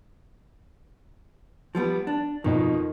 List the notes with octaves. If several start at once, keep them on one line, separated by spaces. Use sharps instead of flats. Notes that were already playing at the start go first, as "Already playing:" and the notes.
F3 G3 B3
D4
F2 B2 D#3 D#4